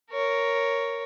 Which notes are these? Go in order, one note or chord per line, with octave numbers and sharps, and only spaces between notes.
A#4 C#5